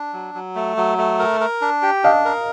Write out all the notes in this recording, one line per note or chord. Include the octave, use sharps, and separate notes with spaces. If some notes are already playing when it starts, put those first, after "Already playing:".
Already playing: D4
F#3
F#3
A3
F#3
A3
A#4
A#4
D4
G4
D4 D#5 F5
A#4